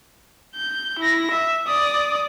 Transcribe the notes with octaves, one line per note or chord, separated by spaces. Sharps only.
G6
E4 A#6
E5
D5 D#6